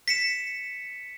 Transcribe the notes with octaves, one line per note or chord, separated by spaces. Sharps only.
B6 C#7 E7